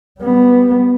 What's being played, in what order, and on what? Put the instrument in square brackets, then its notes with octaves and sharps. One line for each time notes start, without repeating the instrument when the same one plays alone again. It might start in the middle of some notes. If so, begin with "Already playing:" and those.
[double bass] G3 B3